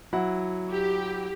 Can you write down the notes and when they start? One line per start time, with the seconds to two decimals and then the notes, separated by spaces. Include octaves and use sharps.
0.13 F#3 E4 F#5
0.72 G4